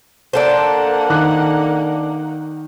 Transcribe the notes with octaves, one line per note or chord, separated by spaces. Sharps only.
A#3 D4 A4 C5 F#5
D#3 D6 F#6